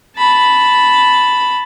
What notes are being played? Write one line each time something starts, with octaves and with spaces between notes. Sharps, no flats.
A5 B5